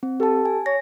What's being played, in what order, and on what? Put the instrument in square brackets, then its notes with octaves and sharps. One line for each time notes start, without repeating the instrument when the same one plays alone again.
[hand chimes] C4
[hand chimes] G4 A5 [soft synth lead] A4
[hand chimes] G#5
[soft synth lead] C#5 [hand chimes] A#6